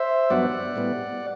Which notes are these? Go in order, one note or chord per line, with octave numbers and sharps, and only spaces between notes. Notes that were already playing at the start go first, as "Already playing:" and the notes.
Already playing: C5 E5
G2 F#3 B3 D5 F#5
A2 G3 B3